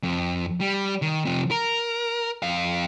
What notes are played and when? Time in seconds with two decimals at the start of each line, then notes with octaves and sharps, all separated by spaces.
0.03 F2
0.61 G3
1.02 D#3
1.25 C3 F3
1.51 A#4
2.43 F2 F5